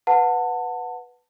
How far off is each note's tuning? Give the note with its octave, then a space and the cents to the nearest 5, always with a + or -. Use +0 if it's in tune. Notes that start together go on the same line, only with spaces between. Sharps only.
B4 +0 F#5 -15 A5 +25